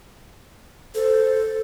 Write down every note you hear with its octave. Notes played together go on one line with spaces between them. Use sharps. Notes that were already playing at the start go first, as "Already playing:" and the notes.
A4 C5